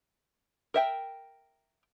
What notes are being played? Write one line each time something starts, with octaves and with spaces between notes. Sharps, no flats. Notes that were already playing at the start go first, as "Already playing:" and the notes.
A#4 E5 G5